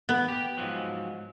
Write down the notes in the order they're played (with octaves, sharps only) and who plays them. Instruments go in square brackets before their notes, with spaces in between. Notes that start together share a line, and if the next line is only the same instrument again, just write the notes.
[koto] B3
[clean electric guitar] G4
G#2 F3 F#3